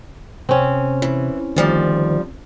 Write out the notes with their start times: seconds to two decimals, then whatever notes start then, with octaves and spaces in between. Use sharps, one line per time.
0.49 C3 C4 C#4
1.02 E3
1.56 D2 D#3 F3 G3